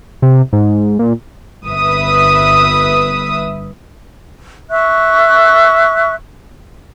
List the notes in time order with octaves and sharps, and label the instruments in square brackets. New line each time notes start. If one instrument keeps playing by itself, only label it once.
[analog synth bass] C3
G#2
A#2
[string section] G1 B4 E5 D#6
[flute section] E5 C#6 F#6